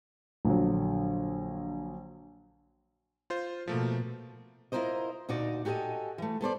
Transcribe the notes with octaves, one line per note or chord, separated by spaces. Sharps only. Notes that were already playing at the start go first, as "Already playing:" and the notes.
A#1 D3 F#3
F4 C5
B2 F3 A3 A#3
E4 F4 G4 A#4 C5 D#5
D2 A#2 D#4 F#4 D5
F#4 G4 A4 B4 D#5 G#5
E3 A3
B3 A4 C5 D5